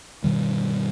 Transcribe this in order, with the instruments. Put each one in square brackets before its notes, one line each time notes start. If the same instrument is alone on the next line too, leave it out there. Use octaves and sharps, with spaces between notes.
[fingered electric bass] G2 B2 D#3 G3